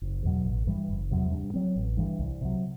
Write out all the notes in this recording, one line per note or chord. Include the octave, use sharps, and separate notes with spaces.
F#1
E2 B2 F#3
A1
G2 E3 G3
F#1
E2 C3 F#3
G2
F#3 C4
A1
G2 E3
C2
C3 F#3